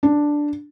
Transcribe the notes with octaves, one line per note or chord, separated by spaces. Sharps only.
D4